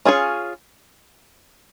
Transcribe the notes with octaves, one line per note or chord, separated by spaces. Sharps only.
C#4 F4 G#4 C#5